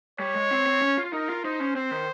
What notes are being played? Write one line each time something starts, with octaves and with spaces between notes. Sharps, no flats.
G3 C#5
G#3
C4
C4
C#4
F4
D#4 A#4
F4
D#4 C5
C#4
C4 C5
D#3